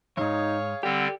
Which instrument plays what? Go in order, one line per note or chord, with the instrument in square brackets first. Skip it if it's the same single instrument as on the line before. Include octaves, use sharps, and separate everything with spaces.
[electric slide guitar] E2 G#2 [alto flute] D#4 [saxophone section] G#4 C#5 F5
[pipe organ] D3 G3 C4 [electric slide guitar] G4 [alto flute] F#5